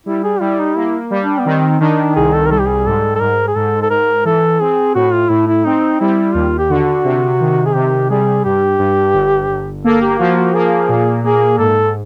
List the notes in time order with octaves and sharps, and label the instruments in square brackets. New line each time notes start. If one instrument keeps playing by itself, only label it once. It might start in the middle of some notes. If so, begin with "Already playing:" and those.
[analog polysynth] G3 [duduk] E4
[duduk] G#4
[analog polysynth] G3 [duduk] E4
[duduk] D#4
[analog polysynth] A#3 [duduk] E4
[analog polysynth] G3
[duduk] D4
B3
[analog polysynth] D#3 [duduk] C4
[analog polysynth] D#3 [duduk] D4
[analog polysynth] C2 [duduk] G#4
[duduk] A4
A#4
[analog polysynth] G3 [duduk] A4
[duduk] G4
G#4
[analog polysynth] G#2 [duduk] A4
[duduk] A4
[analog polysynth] G#2 [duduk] A#4
[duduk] G#4
[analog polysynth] G#2 [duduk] A4
[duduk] A4
[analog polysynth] G#2 [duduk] A#4
[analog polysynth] E3 [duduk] A4
[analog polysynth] C4 [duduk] G#4
[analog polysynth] A2 [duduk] F#4
[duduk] F4
[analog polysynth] A2 [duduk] E4
[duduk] E4
[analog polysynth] C4 [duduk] D#4
[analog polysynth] G3 [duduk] E4
[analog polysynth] D#2 [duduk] F4
[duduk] G4
[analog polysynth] D3 [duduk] F#4
[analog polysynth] C3
D#3
[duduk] G#4
[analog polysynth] C3 [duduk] G4
[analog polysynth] G3 [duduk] G#4
[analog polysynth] G2 [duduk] G4
[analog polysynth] G2
G1
G1
[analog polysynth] A#3 [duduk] A4
[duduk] G4
[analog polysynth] F3 [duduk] F#4
[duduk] F#4
[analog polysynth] A#3 [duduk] G#4
[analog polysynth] A#2
[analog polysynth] A#3 [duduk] G#4
[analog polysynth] G#2 [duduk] A4